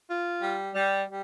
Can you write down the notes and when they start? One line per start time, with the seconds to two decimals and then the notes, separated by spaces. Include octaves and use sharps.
0.10 F4
0.41 G3
0.74 G3
1.07 G3